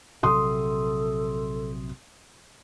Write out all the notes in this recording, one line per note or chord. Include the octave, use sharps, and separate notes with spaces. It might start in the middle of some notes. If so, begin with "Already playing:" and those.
A#1 C3 F#3 A4 C6 D#6